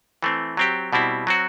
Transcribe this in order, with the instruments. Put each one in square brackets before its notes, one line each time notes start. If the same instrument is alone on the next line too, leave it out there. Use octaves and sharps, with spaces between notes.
[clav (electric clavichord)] E3 A3 C4
F#3 C4 G4
B2 G3 C4 E4
F#3 C4 F#4